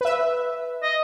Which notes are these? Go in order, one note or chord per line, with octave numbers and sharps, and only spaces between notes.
B4 E5
D#5